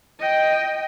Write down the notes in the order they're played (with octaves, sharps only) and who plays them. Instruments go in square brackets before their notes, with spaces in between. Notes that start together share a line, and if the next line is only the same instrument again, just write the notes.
[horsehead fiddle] D#5 G5